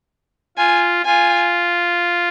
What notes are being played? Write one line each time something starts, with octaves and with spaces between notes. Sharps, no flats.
F4 G#5
F4 G#5